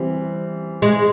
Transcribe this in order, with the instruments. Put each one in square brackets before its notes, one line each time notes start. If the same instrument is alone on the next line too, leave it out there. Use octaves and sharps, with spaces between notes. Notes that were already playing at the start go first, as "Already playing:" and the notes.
Already playing: [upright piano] E3 G3 C4
[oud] G#3